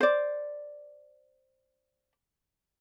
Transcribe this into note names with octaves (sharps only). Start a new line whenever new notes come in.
C5 D5